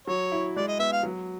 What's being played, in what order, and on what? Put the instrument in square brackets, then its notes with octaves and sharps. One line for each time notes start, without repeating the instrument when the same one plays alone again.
[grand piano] F#3 [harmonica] C#5
[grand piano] E4
[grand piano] G#3 [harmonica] D5
[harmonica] D#5
[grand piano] B3 [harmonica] E5
[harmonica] F5
[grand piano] F#3